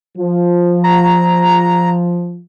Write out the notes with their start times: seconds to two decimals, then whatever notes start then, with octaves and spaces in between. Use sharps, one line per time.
0.17 F3
0.84 A#5